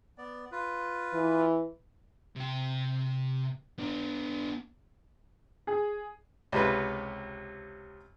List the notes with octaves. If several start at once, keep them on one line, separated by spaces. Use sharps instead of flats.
B3 D5
F4 B4
E3
C3 G5
B3 D4
G#4
C#2 C3 B4